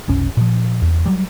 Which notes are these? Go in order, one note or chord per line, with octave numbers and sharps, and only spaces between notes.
F1 B1 C#4
A#2 F3
E2
F#3 G3